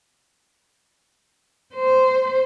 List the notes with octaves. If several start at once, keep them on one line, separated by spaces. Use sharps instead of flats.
C5